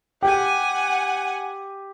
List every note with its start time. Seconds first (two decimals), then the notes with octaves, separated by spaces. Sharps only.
0.22 G4 F#5 G#5